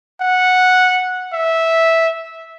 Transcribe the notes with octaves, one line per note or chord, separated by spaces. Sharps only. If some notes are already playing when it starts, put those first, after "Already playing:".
F#5
E5